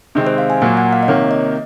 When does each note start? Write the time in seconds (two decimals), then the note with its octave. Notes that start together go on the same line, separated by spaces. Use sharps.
0.15 C3 D#3 G#3 C4
0.27 C5
0.38 F5
0.50 G#5
0.62 A#2 F#3 A#3 F#5
0.77 F#5
0.93 F5
1.03 D#5
1.08 C3 D#3 A#3 C#5
1.31 D#5